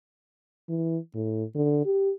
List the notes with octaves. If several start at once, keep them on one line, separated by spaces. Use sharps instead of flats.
E3
A2
D3
G4